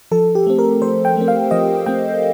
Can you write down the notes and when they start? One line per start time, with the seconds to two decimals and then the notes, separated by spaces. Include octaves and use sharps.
0.11 F3 A4
0.35 G4
0.47 A3 C4
0.59 A#4
0.82 F3 C5
1.05 G5
1.17 A3 C4
1.28 F5
1.51 F3 D#5
1.86 A3 C4 G5